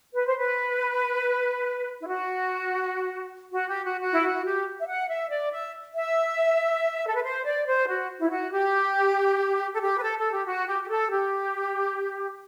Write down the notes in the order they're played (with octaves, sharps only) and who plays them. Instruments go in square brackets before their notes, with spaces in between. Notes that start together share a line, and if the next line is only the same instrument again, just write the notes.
[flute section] B4
C5
B4
E4
F#4
F#4
G4
F#4
F#4
E4
F#4
G4
E5
F#5
E5
D5
E5
E5
A4
B4
C5
D5
C5
F#4
E4
F#4
G4
A4
G4
B4
A4
A4
G4
F#4
G4
G4
A4
G4